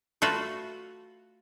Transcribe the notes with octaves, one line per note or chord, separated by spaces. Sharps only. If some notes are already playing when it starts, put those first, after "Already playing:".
A3 F4 F#4 B4